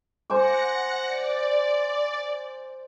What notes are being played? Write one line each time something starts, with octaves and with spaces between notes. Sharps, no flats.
C5 F#5 G#5 D6 A#6 C#7
D5